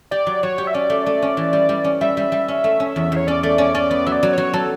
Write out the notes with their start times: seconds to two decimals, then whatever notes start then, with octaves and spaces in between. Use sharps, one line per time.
0.11 G4 D5
0.27 F#3
0.43 F#3 C#5
0.58 G4
0.67 E5
0.74 C#4 D5
0.90 A3
1.06 A3
1.22 C#4
1.37 E3
1.53 G3
1.69 G3
1.84 C#4
2.01 G3 E5
2.17 G3
2.32 G3
2.48 C#4
2.64 A3
2.80 C#4
2.96 E2
3.12 E2 C#5
3.27 C#4 D5
3.43 A3 D5
3.58 C#4 D5
3.75 C#4 D5
3.90 B3 D5
4.07 F#3 E5
4.12 D5
4.23 F#3
4.33 F#3 C#5
4.53 F#3 A4